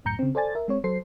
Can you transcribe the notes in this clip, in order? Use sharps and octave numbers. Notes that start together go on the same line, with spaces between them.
C2 F#2 A2 A#5 G6 C#7
C#3 C4
A4 C5 D5 G#5 A6
A#4 E5
G#3 C4 C#5
F#3 A4 C5 C7